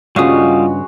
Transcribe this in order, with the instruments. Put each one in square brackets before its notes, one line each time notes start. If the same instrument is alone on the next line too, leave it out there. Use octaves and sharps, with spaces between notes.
[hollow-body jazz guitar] G2 C#3 [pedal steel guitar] G3 F5 D#6 [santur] G#3 F#4 [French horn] F4